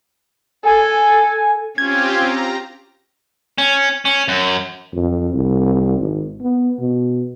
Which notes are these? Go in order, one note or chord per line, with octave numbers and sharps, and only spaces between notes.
A4 G#5
C4 C#4 F4 G4 G#6
A#5
C#4
C#4
F#2
F2
C2
G#1
B3
B2